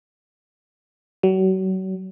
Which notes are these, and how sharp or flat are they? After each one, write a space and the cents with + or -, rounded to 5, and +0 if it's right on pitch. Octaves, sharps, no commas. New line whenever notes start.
F#3 +35